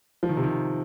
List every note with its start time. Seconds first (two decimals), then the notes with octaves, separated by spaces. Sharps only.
0.23 F3
0.29 D#3
0.37 C3
0.44 D#3